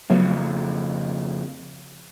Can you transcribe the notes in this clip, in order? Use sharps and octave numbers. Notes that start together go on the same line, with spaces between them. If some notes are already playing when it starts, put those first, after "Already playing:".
F2 C#3 F#3 A3 B3